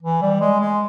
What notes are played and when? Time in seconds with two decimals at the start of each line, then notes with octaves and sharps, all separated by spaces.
0.02 E3
0.22 G3
0.40 G#3
0.60 G#3